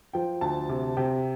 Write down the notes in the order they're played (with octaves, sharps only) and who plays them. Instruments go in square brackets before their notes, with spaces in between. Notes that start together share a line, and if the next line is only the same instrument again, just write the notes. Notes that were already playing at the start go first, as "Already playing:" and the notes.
[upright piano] F3 G5
D2 A5
C3
C3 G5